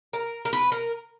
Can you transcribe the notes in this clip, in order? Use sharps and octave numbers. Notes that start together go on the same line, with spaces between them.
A#4
A#4
B4
A#4